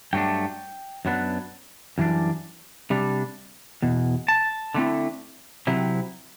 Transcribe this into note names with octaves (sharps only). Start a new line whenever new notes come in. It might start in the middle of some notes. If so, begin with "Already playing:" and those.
G2 F#3 A3 D4 G5
F#2 F#3 B3 D4
F#2 E3 G3 D4
C3 G3 D4
E2 B2
A5
D3 A3 C4 E4
C3 F#3 C4 E4